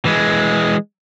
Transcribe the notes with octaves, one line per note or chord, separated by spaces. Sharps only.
E3 G#3